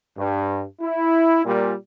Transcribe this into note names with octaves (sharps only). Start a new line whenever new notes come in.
G2
E4
A#2 G3